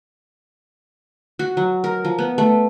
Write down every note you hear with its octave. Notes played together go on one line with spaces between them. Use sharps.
F#4
F#3
A#4
F3
B3
A3